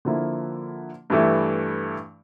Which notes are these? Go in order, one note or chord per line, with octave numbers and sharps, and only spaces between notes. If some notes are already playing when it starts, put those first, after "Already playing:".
D3 F3 A#3 E4
G2 E3 A3 E4